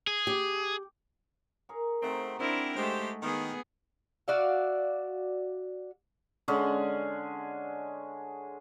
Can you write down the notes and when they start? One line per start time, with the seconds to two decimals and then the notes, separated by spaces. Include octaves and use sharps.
0.07 G#4
0.27 G4
1.69 G#4 A#4 C#5
2.02 A3 C4 D#4 F#4 G#5
2.39 C4 D4 E4 A#4
2.76 G#3 A3 G4 C5
3.22 D#3 B3 G#4
4.28 F#4 D5 E5 F5
6.48 D3 G#3 C#4 G#4